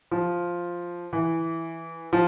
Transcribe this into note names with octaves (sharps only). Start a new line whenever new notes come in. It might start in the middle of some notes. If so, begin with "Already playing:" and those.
F3
E3
F3